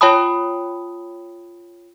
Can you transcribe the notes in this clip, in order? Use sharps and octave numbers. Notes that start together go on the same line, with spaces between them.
F4 C#5 G5 A5 B5 D#6